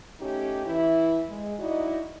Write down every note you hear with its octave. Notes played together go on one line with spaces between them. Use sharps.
A3 C#4 D#4 G4
E3 E4
G#3
D#4 E4 F#4 D5 D#5